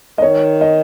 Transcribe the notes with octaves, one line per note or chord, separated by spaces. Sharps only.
D#5
D#3 C#5
D#5